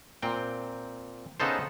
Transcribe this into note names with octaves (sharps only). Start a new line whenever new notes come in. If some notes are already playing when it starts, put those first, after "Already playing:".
A#2 C4 G5
C#3 B3 D#4 A4 C5